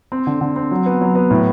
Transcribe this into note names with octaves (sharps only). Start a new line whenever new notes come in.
C4
D3
D3
C4
F#3
B3
F#3
B3
A2